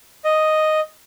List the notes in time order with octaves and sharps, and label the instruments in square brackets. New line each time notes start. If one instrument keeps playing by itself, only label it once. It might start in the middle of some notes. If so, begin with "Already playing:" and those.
[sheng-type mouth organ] D#5